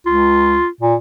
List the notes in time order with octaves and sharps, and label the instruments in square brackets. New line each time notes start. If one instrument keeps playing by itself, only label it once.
[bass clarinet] C#2 [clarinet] F4
[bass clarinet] A#2